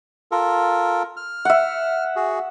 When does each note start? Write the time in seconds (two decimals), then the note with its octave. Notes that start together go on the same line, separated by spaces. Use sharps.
0.32 F4 A4 A#4
1.17 F6
1.45 E5 F#5
2.16 F#4 G#4